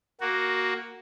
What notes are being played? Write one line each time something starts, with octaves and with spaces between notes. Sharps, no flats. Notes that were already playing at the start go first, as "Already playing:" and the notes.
A#3 F#4